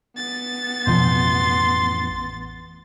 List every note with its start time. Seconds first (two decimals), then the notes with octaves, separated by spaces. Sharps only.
0.16 B3 A6
0.87 A1 F2 B2 F3 C6